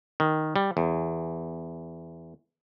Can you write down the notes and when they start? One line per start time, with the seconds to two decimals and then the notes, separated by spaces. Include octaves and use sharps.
0.20 D#3
0.56 G3
0.77 E2